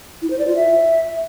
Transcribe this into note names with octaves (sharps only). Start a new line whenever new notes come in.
E4
C5
D5
F4
E5